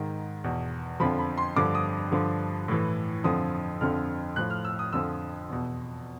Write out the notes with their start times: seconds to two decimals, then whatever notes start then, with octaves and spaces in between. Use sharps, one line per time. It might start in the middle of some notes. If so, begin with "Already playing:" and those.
Already playing: G#2 D#3
0.44 E2 B2
1.00 F2 D3 F3 B5
1.19 B5
1.38 C6
1.56 G2 D3 F3 D6
1.75 D#6
2.12 G2 D3 F3
2.68 A2 E3
3.24 F2 D3 F3 D#6
3.81 F2 D3 F3 F6
4.36 A2 F3 F#6
4.50 F6
4.65 E6
4.79 D#6
4.93 F2 D3 F3 E6
5.50 E2 B2